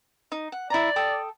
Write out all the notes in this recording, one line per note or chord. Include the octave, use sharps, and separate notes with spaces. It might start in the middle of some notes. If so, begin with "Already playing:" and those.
D#4
F#5
E4 D5 A#5
A4 G5 D#6